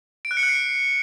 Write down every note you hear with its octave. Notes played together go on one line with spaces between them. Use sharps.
D7
F#6
C#7
F#6
C7